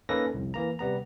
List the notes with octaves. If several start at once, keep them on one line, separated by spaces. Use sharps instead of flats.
A#3 C#4 D#4 A4 B4 A#6
C2 F2
E3 A#3 A#5
C3 G3 B3 A#5